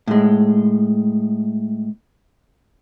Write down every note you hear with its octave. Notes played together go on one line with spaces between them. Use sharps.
A2 G#3